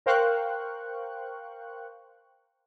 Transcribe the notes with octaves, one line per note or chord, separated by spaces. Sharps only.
A#4 C5 F5 G5 C#6 F#6